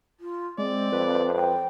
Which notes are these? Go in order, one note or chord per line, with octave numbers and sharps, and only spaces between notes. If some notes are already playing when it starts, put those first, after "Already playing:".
F4
G#3 C4 D5
F2 B4
G5